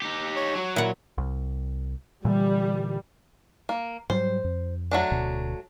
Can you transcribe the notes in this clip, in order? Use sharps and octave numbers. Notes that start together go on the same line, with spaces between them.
D#4 G4
C#5
F#3
A#2 E4 F#5
C2
A#2 D3 E3 G3
A#3
G#2 F#3 G3 C5
F2
F#3 A3 D4
D1 D2 B2